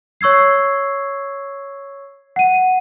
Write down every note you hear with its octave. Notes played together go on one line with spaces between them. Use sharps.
C#5 C#6 E6 G#6 C7
F#5 D#7